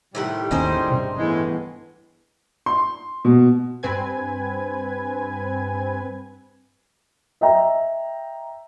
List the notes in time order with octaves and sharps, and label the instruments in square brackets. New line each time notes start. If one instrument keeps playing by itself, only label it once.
[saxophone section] A2 D#3 G3 [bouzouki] C3 G4 F#5
[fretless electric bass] G#1 D#2 C#4 [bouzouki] D#4 G#4 C5
[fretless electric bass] G2 [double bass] C3
[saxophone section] A2 G#3 [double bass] E3 B3
[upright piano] C6
B2
[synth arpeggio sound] G2 C4 B4 G#5 G#6
[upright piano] D#5 E5 G5 A#5